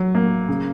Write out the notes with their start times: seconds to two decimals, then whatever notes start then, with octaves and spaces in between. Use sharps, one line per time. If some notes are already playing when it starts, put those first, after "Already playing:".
Already playing: F#3
0.15 A#3
0.48 C#3